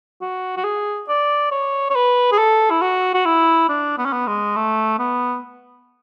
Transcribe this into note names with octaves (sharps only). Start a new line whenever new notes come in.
F#4
F#4
G#4
D5
C#5
C#5
B4
G#4
A4
E4
F#4
F#4
E4
D4
B3
C#4
B3
G#3
A3
B3